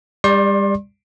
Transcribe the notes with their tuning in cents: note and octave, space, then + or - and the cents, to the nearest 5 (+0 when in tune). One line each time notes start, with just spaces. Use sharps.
G3 +35 D5 +0 C6 +35